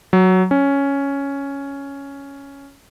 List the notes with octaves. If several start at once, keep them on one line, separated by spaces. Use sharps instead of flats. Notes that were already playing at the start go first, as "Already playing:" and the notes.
F#3
C#4